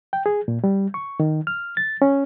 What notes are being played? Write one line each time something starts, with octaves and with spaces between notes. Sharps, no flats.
G5
G#4
A#2
G3
C#6
D#3
F6
A6
C#4